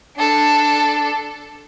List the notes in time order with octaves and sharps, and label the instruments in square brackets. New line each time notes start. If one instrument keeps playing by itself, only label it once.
[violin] D4 A4